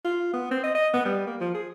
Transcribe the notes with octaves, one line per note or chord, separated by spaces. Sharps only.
F4
B3
C4
D#5
D#5
B3
G3
A#3
F3
G#4